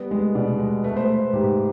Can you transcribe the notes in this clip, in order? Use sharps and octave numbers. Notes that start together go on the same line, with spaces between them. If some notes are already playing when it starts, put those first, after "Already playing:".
Already playing: G3 B3
G#3
B2 D5
G#3
A3 B4
C5
A3 B4
G#2 G4